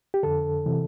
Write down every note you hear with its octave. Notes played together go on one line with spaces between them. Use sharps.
G4
F2 D3 A4
C3 E3